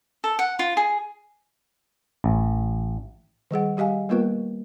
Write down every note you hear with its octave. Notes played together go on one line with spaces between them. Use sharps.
A4
F#5
F4
G#4
A1
D#3 G3 G#4 F#5
G3 G4 D#5 F5 G#5
G3 A#3 B3 F4 A#4 B4